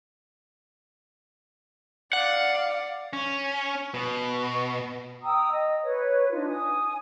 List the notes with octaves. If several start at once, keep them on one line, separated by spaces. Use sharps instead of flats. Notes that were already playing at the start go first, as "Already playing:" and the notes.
D5 F5 F#5
C#4
B2
G5 A#5 D#6 E6
D#5
B4 C#5
D4 D#4 F4
G#5 D#6